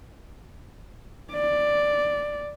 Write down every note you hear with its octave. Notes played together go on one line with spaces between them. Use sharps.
D5